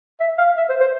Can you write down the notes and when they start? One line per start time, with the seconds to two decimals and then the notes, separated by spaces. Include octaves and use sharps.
0.20 E5
0.38 F5
0.57 E5
0.69 C5
0.80 C5